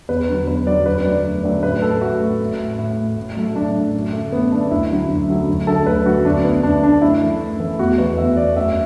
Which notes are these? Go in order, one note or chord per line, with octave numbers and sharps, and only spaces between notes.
E2 B4
D3 F#3
E2 B4
D3 F#3 D5
F#2 B4
D3 F#3 A3 D5
F#2
D3 F#3 A3 D5
A2 B4
A3 A4
A2 F#4
A3
A2
A3
A2
A3
A2
F#3 A3
A2 D4
F#3 A3
F#2
D3 A3
F#2 B3
D3 A3 D4
D2 E4
D3 F#3 A3
D2
D3 F#3 A3
D2
D3 F#3 A3 A4
D2 B4
D3 F#3 A3 F#4
D2 D4
D3 A3 B3
D2 D4
D3 A3 D4
F#2 E4
E3 A3
F#2
E3 A3
E2 F#4
E3 A3 B4
E2 E5
E3 A3 D5
F#2 E5